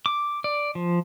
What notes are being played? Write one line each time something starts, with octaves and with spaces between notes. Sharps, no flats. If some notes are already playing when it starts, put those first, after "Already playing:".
D6
D5
F3